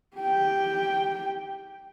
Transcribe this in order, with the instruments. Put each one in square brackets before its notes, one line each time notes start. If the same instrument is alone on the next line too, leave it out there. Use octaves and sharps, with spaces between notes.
[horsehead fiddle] G4 G5